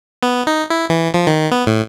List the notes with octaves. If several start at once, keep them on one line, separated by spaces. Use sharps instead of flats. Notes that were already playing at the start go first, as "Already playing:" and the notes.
B3
D#4
E4
E3
F3
D#3
B3
A2